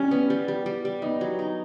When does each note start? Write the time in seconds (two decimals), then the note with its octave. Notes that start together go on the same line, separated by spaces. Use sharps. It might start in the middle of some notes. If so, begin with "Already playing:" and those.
Already playing: G3 C#4
0.11 B3
0.30 G3
0.48 G3
0.66 G3
0.85 G3
1.02 B3 D#4
1.21 F#3
1.39 D#4